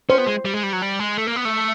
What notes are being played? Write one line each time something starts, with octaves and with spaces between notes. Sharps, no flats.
C#4 C5
B3
G#3
G3
G#3
G3
F#3
G3
G#3
A3
A#3
B3
A3